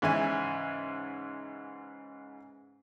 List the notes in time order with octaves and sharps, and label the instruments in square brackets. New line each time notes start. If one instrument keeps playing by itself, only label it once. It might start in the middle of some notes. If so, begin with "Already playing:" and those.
[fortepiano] G#2 C#3 E3 E5 G#5